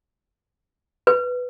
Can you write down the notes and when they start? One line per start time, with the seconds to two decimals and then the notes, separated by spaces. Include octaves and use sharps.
1.07 B4